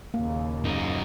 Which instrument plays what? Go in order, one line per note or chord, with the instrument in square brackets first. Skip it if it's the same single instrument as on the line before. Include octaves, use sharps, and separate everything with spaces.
[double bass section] D#2 A#2 C#3 [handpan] A#3
[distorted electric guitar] F#2 D#4